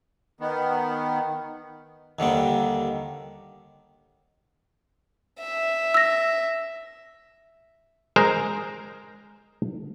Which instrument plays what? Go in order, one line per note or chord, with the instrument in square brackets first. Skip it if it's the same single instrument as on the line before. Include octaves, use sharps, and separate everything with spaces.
[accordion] D#3 B3
[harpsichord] D#2 D3 D#3 G3
[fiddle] E5
[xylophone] E6 A#6
[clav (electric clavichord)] G#3 A#4 C5 A#5